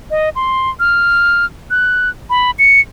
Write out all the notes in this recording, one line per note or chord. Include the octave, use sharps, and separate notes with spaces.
D#5
C6
F6
F#6
B5
C#7